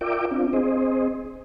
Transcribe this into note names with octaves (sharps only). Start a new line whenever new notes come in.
F4 A#4 D5 E5 G5 D6
C4 D4 F4
C4 G#4 C5 D#5